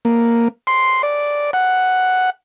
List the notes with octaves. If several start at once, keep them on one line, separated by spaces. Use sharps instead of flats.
A#3
C6
D5
F#5